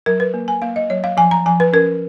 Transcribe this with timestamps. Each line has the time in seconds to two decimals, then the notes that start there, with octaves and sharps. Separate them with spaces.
0.06 F#3 A#4
0.20 B4
0.34 A#3
0.48 G#5
0.62 A#3 F5
0.76 D#5
0.90 F#3 C#5
1.04 F5
1.17 F3 G#5
1.31 A#5
1.46 F3 G#5
1.60 B4
1.73 C#4 A#4